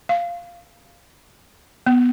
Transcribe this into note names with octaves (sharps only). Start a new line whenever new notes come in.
F5
B3